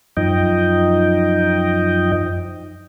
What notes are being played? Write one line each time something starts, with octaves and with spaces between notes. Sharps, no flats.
F#2 F3 D#4 D#5 G5